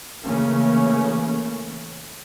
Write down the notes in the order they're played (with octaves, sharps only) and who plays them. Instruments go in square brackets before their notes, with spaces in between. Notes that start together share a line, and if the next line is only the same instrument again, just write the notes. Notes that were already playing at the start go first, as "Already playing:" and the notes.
[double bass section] C#3 E3 A3 A#3 C#4